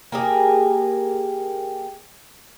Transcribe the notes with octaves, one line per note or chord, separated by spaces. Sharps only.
A#3 G4 G#4